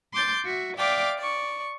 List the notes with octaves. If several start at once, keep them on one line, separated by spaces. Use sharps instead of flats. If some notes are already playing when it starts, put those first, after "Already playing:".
C6 D6 G6 A6
F#4 E5
D5 E5 F5 G5 D6
D5 C#6